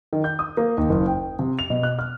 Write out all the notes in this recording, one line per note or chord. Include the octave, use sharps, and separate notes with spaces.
D#3
G6
D#6
A#3
D#2
F#1
G5
C3
F7
B2
F#6
F6